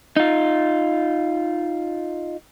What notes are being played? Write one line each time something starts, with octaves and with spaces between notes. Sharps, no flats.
D#4 F4